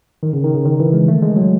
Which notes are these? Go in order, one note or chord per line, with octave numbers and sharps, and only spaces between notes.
D#3
C#3
D#3
C#3
D#3
E3
G#3
A3
G#3
F#3